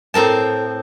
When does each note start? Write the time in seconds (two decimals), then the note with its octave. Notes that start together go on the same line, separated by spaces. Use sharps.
0.14 A2 C4 A#4 A5